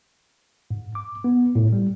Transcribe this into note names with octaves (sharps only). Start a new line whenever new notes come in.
G#2
D6
B3
A2
G3